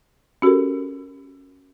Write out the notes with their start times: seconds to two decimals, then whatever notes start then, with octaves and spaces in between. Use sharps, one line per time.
0.42 C#4 F#4 G4 A4 A#4